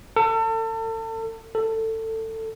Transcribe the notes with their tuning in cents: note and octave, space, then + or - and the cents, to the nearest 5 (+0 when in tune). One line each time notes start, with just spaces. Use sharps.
A4 +35
A4 +20